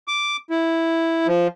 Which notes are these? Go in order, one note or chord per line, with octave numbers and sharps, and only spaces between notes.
D6
E4
F3